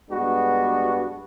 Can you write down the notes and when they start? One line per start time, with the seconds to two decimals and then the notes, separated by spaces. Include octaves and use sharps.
0.10 G2 G#3 B3 D4 F#4